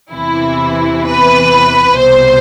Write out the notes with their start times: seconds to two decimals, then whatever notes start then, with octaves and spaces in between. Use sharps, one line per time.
0.12 E2 C3 E3 E4
1.05 B4
1.97 C2 B2 C5